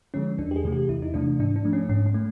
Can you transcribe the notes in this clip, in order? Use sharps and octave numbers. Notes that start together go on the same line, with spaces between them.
D3 F3 G#3 C#4
E2 D4
G4
G#4
C3 E3 A3
G4
E2 E4
D#4
C3 E3 A3 D4
G#2 D4
D4
F3 A3
C#4
G#2 C#4
C#4
A3